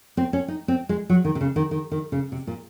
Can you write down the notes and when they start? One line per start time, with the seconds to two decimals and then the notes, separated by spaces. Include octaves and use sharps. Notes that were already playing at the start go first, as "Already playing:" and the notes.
0.17 C4
0.33 C#4
0.48 D#4
0.68 C4
0.89 G#3
1.10 F#3
1.25 D#3
1.35 C3
1.41 C#3
1.56 D#3
1.71 D#3
1.92 D#3
2.12 C#3
2.32 C3
2.47 A#2